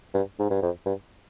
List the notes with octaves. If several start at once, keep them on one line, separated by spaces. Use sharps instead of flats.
G2
G#2
G2
F2
G2